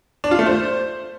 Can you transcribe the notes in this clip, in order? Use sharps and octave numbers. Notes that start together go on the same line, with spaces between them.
D4
F4
A3
C5